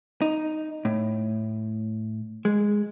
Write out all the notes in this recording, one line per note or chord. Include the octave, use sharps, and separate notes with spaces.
D#4
A2
G#3